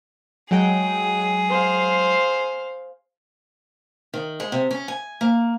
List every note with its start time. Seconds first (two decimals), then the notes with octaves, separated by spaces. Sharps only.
0.51 F#3 G#3 G#4 G5
1.50 C5 F5
4.14 D#3
4.40 G#3
4.52 C3
4.71 C#4
4.88 G#5
5.21 A#3